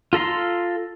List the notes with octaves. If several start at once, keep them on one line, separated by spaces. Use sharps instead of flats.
F4 A4 A#5 C6